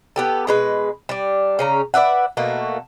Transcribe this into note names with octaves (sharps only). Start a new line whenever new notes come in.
B3 G4 A4
B2 G#3 B4
G3 D4
C#3 C#4 A#5
B4 D5 E5 F#5
B2 A3 A#3 F#4